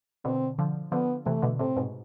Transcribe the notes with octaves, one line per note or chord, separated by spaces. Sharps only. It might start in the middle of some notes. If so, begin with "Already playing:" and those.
B2 D3 C4
D3 F3
D3 F3 B3
C3 E3 A3
B2 D3
A2 C3 C4
G#2 B2